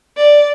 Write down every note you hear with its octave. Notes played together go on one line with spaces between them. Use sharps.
D5